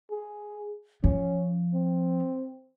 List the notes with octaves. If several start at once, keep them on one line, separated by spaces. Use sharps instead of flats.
G#4
F3 C#4
C4